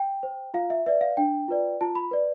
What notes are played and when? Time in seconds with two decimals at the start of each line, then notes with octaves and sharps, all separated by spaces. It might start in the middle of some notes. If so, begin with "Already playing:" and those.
Already playing: G5
0.23 C5
0.54 F4 F5
0.70 E5
0.86 B4 D5 E5
1.01 F5
1.17 D4 G5
1.48 F4 B4 D5
1.81 F4 A5
1.95 B5
2.11 B4 D5